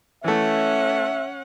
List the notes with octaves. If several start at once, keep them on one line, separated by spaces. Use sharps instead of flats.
E3 A3 C#4 E5 F#5